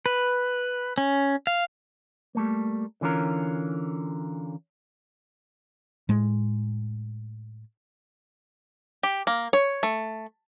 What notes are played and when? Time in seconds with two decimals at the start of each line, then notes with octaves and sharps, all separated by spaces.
0.06 B4
0.98 C#4
1.47 F5
2.35 G3 A3 A#3
3.01 D3 E3 C#4 F4 A#4
6.09 A2 G#3
9.03 G4
9.27 A#3
9.53 C#5
9.83 A3